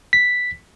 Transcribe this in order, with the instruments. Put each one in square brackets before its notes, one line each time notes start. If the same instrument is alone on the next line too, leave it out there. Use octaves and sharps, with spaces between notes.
[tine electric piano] B6